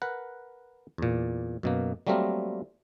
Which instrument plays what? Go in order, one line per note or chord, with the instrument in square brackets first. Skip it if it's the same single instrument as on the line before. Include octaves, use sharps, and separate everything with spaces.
[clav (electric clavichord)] A#4 B4 F#5
E2 A#2
F#2 B2 A#3
F#3 G3 A3 A#3 C4 A#4